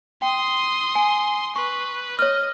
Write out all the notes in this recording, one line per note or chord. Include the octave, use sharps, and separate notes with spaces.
G5 C6 D#6
G#5
B4 C#6
C#5 D#5 F6